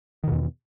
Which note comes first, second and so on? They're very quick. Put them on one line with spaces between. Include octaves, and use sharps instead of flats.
D#3 B2 E2